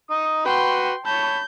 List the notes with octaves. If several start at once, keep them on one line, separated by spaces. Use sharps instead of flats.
D#4 D#6
F#4 B4 G5 C6
C#5 A5 B5 G6